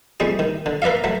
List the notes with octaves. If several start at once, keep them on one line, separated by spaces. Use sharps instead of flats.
F2 G3 G#4
D#3
D3
A#4 B4 D5 E5 F5
F#3 A3